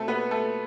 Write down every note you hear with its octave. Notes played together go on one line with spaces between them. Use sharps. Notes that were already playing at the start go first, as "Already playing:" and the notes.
Already playing: B2 A3 C4 A4
B3 B4
A3 A4